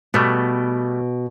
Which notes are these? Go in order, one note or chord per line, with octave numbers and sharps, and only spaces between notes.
B2 G3 A3 B3